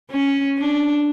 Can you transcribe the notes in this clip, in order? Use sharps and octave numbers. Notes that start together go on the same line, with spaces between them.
C#4
D4